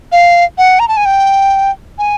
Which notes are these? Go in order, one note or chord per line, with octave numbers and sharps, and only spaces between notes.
F5
F#5
A#5
A5
G#5
G5
G#5